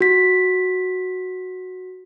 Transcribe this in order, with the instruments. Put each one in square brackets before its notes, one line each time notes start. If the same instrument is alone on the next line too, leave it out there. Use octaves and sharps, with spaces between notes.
[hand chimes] F#4 B6